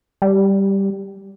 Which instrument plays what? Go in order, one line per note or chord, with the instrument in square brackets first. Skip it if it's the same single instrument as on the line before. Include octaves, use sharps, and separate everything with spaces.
[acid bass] G3